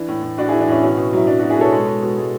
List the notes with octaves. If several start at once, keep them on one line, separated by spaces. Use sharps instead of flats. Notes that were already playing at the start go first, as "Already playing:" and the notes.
Already playing: E3 D4
A2
A2
A2 D4 F#4
E3 E4 G#4
D4
A2 C#4 E4
B2 C#4
B2
F#3 E4
F#3 D4
B2 D4 F#4
E4 G#4
B2 A4 C#5
G#3
G#3
B2
G#3